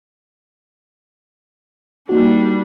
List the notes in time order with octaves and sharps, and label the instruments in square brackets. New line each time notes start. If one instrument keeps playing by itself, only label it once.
[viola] G3 D4 [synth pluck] A#3 D#4 F#4